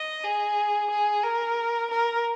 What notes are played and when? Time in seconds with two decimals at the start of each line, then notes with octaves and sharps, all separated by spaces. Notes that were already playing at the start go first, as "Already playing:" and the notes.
Already playing: D#5
0.24 G#4
0.91 G#4
1.24 A#4
1.91 A#4